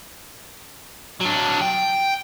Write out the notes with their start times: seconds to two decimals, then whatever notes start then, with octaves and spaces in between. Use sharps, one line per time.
1.20 F#3 D4
1.61 G5